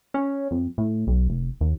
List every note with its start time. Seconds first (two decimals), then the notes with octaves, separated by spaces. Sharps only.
0.14 C#4
0.51 F2
0.78 A2
1.07 B1
1.29 F1
1.61 D#2